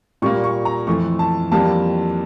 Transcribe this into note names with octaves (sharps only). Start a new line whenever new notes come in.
A#2 G3 A#3 C#6
C#6
A#5
F2 E3 A3 C#6
A5
F2 E3 G3 A#3 A5